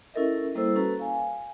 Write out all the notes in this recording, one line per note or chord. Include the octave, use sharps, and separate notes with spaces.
C#4 E4 A4 A#4 D#5 E5
G3 A#3 E4 A4 C5 E6
C#4 F#4 A4 B4 A#5
F5 G#5